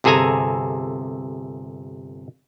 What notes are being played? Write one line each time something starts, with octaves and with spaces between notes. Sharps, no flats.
G1 C3 G#4 A4 G#5 A#5